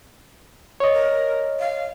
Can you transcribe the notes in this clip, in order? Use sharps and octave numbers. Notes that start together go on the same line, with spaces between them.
C#5 D#5
A#4
F5